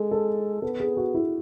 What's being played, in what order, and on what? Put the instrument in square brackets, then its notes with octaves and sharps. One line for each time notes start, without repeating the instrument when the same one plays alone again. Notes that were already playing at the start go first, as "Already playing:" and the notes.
Already playing: [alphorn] G#3 [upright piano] A4
[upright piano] A4
[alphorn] B3 [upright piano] A4
[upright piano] G#4
F#4
E4